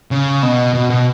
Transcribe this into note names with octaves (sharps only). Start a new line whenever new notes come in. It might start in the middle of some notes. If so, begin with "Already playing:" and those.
C#3
B2
B2
B2